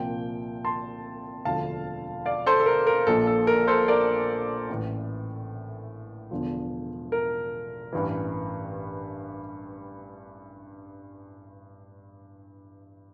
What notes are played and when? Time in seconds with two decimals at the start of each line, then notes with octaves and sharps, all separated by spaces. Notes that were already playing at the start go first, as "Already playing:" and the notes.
Already playing: C2 A#2 F3 G5
0.65 A5 C6
1.45 E1 D2 D3 F3 F5 A5
2.26 D5 F5
2.46 A4 C5
2.60 A4
2.66 A#4
2.87 A#4
3.07 A#1 A#2 F3 A4
3.27 A4
3.47 A#4
3.67 A4 C5
3.88 A#4 D5
4.69 A1 A2 E3
6.31 E1 E2 D3 F3
7.12 A#4
7.93 A1 G2 E3